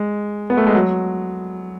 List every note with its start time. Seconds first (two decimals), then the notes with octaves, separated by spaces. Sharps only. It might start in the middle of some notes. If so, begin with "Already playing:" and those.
Already playing: G#3
0.50 B3
0.57 A3
0.67 G#3
0.74 F#3